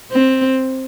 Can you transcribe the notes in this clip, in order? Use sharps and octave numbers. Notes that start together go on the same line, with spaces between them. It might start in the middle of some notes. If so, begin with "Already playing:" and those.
C4